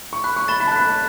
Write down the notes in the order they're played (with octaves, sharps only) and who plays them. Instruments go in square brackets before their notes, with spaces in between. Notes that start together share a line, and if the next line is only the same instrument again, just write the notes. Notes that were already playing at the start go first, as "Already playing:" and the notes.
[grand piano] C#6
[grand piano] B5 [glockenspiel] F#6
[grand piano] C#6
[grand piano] B5 [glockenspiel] A6 E7 G7
[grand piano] B5
A5
[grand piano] B5 [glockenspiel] F#6